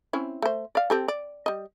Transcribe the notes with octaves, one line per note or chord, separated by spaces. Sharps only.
C4 C#4 E4
A3 C5
D5 F5
C4 G4 A4
D5
G3 D#5